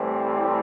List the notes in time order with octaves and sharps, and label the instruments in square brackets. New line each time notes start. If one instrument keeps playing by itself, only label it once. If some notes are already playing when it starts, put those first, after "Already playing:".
Already playing: [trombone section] A2 E3 G3 C4